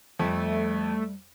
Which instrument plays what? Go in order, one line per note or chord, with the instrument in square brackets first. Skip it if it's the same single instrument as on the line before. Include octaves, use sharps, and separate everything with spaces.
[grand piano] F2 [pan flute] G3 [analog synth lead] A3